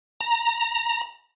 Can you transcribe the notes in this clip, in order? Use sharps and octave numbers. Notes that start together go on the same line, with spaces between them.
A#5